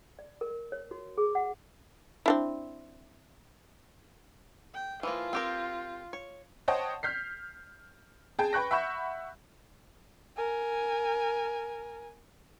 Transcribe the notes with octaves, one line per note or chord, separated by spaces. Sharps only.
D5
A#4
C#5
F#4
G#4
F#5
C4 D4 E4
G5
E3 F3 A#3 F4
C4 G4 A#4
C#5
C5 C#5 D#5 F#5 G5 A5
F6 G6 B6 C7
G#4 G5 A5
B4 G5 C#6 F#6 A#6
E5 F#5 B5 C#6 G6 E7
A#4 G#5